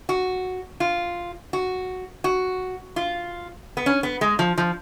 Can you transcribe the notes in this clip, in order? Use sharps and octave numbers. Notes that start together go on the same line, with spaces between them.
F#4
F4
F#4
F#4
F4
B3
C#4
B3
G#3
F3
F3